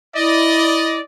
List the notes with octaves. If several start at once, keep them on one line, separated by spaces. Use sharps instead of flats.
E4 D5 D#5